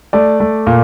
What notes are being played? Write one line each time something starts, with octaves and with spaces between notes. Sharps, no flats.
A3 D5
A3
A#2